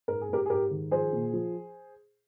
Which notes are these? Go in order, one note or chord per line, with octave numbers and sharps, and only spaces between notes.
G#2 A#4
G#4
G#2 G4 A#4
G#4
G#2 G4 A#4
D#3
F3 G#4 C5
A#2
F3